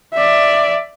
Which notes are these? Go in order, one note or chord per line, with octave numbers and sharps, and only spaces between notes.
D5 E5